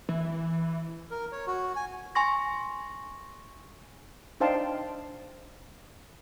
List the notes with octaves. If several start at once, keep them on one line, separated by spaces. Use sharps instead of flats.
E3
A#4
C#5
F#4
G#5
G#5 C6 C#6 A#6
D4 D#4 C5 F5 G5 A5